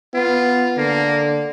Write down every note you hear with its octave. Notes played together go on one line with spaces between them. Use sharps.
B3 F4
D3 A#3